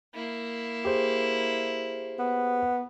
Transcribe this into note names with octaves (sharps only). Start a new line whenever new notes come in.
A#3 E4
G4 G#4 C5
B3